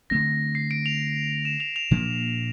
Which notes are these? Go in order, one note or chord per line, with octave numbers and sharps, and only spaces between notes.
D3 A3 C4 A#6
C7
D7
F7
E7
F7
F7
A#2 F3 A#3 D4